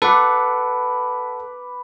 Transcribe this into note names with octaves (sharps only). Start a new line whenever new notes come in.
A4 B4 F#5 D6